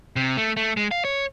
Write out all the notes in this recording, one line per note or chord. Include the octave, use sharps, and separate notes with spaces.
C3
A3
A3
G#3
F5
C#5